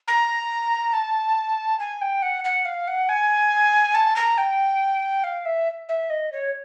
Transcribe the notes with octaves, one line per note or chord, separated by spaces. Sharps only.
A#5
A5
G#5
G5
F#5
F#5
F5
F#5
G#5
A5
A#5
G5
F5
E5
E5
D#5
C#5